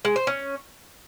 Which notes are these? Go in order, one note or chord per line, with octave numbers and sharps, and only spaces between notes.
G#3
C5
C#4